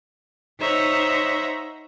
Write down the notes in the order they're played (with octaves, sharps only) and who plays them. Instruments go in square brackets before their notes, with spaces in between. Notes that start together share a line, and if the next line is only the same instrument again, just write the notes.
[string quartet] D#4 C5 C#5 E5 F#5 A#5